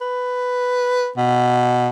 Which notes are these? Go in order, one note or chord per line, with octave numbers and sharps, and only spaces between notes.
B4
B2